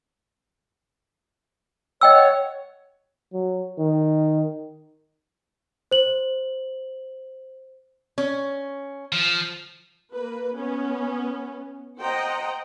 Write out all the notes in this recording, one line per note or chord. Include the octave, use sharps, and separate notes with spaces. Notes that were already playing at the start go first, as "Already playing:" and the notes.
C#5 D#5 F#5 G5 E6
F#3
D#3
C5 F#7
C#4
F3
A#3 B4
B3 C#4
C5 D#5 F#5 G5 A#5